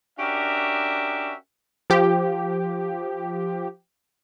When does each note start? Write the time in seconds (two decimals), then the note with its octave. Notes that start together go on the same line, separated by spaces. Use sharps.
0.18 C#4 D4 F#4 G4 A#4 E5
1.90 F3 G4